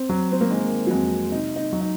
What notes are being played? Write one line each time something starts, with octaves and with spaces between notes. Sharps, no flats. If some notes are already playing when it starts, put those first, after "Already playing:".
Already playing: C4
F#3
C4
A#3
D#3 G#3
F#3
F2 G#3
C3 D#4
D#4
F#3
D#4